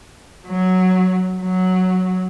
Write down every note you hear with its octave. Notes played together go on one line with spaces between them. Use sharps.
F#3
F#3